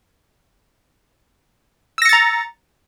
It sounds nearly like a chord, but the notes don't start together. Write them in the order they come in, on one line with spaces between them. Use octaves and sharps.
E6 A#6 C#7 A6 A#5